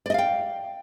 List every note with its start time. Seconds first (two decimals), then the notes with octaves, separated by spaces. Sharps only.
0.06 D5
0.10 D#5
0.14 F5
0.18 G5